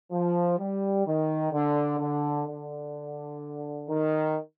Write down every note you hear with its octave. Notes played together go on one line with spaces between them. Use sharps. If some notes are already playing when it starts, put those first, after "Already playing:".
F3
G3
D#3
D3
D3
D3
D#3